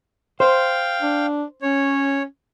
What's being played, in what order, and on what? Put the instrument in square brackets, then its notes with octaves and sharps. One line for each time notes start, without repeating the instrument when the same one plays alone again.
[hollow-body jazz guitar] C5 [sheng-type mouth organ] F5 G5
[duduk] D4
[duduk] C#4 [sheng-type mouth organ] C#5